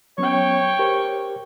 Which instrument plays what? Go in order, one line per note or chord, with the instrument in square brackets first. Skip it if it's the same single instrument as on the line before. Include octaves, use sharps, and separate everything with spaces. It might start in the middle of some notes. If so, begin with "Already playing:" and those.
[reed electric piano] F#3 B3 C#4 [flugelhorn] C#5 [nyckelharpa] G5 C#6
[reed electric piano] G4 A#4 C5